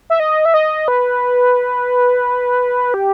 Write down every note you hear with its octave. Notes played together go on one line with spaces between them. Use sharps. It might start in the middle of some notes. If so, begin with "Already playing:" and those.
E5
D#5
E5
D#5
B4
G4